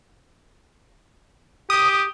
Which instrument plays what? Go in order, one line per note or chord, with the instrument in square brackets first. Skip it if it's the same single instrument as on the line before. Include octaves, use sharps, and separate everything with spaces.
[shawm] G4 [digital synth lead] D#6